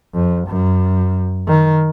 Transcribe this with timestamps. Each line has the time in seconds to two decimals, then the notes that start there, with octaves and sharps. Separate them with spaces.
0.14 F2
0.48 F#2
1.47 D#3